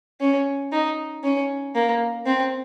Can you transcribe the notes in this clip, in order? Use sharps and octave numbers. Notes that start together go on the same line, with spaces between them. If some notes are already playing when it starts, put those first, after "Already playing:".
C#4
D#4
C#4
A#3
C4